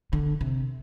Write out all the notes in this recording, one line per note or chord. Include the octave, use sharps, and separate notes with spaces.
D3
C3